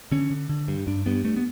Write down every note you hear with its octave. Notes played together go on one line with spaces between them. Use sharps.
D3 C#4
D3
D3
G2
G2 D4
G2 B3
G2 A3
B3